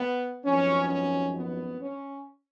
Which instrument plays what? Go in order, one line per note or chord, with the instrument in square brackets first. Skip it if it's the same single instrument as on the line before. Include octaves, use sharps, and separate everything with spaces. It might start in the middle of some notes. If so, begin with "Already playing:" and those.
Already playing: [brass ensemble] B3
G#1 F#2 F3 B3 C#4
C#4
B3
C#4